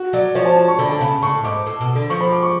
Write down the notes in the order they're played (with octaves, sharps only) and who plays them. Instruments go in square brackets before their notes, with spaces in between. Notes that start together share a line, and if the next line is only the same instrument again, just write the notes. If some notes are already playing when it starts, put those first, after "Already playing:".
Already playing: [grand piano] F#4
[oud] F#3 [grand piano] D5
[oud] F3 [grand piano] C#5
[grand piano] A5
A5
C#6
[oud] D3 [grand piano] B5
[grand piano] A5
[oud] C#3 [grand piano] B5
[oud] A2 [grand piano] C#6
[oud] G#2 [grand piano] D6
[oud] A2
B2
D3
[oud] F3 [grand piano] C#6
[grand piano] B5
D6
C#6